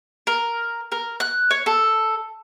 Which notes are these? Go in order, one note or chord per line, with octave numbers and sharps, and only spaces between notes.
A#4
A#4
F#6
C#5
A4